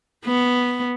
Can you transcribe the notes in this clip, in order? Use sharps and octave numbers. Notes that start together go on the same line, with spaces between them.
B3